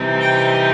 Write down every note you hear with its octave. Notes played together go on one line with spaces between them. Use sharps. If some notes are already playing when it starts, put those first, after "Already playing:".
Already playing: C3 E3 G3 C4 D#4
G5